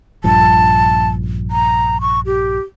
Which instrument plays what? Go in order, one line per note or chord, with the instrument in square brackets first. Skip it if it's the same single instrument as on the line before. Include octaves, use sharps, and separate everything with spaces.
[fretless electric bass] A#1 G2 F3 [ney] A5
[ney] A#5
C#6
G4